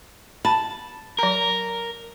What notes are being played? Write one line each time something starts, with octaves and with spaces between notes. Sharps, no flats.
A5 B5
F#3 A#4 A#5